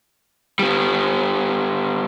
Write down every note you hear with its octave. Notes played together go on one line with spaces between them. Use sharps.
G3 B3